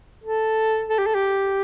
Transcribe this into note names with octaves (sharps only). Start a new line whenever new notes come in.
A4
A4
G4
A4
G4